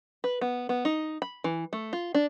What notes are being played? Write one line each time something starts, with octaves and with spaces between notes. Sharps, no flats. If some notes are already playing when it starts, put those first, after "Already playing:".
B4
B3
B3
D#4
B5
E3
A3
F4
D4